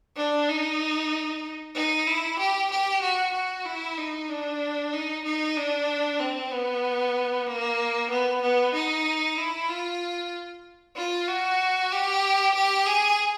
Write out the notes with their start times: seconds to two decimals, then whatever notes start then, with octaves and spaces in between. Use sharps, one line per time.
0.16 D4
0.48 D#4
1.75 D#4
2.07 E4
2.39 G4
2.70 G4
3.02 F#4
3.34 F#4
3.65 E4
3.98 D#4
4.29 D4
4.93 D#4
5.24 D#4
5.57 D4
6.20 C4
6.51 B3
7.47 A#3
8.10 B3
8.42 B3
8.74 D#4
9.37 E4
9.69 F4
10.96 F4
11.28 F#4
11.91 G4
12.55 G4
12.86 G#4